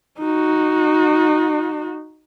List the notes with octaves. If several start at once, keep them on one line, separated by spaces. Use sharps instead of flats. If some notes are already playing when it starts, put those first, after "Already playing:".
D#4 F#4